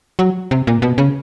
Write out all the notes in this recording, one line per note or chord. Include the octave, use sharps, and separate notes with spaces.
F#3
C3
A#2
B2
C#3